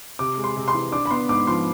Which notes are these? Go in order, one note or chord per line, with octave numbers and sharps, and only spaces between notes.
C3 D6
G#3
C6
C3
C6
E3
D4 D6
B5
B3 C6
G#2 D6
F3 C6